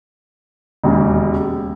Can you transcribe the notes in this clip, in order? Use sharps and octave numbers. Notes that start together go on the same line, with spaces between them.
E1 D#2 C#3